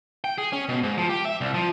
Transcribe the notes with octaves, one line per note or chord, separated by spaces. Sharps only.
G5
G#4
C#4
B2
G#2
F3
G4
E5
C2
F3